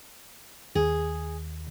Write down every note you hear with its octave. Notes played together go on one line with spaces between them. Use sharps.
D#2 G#4